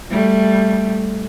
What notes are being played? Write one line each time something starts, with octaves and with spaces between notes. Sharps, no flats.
G3 A3